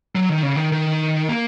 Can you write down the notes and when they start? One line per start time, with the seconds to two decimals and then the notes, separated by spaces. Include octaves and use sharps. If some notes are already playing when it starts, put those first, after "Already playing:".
0.15 F#3
0.29 D#3
0.43 C#3
0.57 D#3
0.72 D#3
1.29 A#3